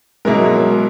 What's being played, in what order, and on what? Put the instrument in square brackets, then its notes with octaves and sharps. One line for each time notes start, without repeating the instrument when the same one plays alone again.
[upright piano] B2 A#3 E4 A#4 [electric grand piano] G#3
[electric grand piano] F#3
G#3
F#3